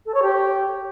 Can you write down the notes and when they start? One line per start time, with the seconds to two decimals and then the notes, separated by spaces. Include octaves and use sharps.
0.06 A4
0.14 C#5
0.23 G4